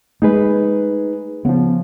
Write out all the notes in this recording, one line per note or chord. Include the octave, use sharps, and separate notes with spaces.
G#3 A3 D#4 G#4 B4
C#3 F3 B3